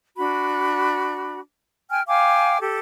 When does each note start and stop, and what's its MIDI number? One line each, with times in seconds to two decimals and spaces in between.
0.17 1.40 62
0.17 1.40 66
0.17 1.40 83
1.90 2.02 79
1.90 2.02 80
1.90 2.02 89
2.07 2.58 77
2.07 2.58 79
2.07 2.58 80
2.07 2.58 86
2.60 2.79 67
2.60 2.79 69